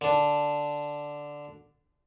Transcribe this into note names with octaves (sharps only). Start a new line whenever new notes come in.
D3 D4